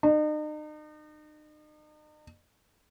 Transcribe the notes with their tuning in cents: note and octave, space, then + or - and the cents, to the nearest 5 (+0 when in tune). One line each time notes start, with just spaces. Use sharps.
D#4 -40